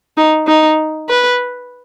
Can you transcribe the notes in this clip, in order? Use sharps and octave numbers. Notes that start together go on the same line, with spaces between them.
D#4
D#4
B4